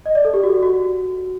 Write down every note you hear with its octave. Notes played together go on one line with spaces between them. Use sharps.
D#5
D5
A4
G4
F#4
F#4